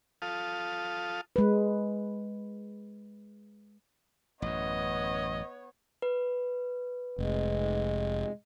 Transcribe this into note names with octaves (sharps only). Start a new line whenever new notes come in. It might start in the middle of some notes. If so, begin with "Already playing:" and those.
F4 A4 F5 D#6
G#3 B4
A1 F#2 B3 C#5 D#5
B4
F1 G#3